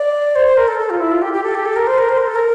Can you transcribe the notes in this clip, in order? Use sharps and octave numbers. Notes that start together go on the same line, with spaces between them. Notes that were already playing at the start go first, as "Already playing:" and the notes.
Already playing: D5
C5
C5
A#4
A4
A4
F4
E4
F4
G4
G4
A4
G4
A4
A#4
C5
A#4
C5
A#4
A4
A#4